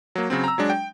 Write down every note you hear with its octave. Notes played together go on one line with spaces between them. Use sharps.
F#3 A#3
C#3 F#3 C4
A#5 E6
F#3 G#3 D4
G5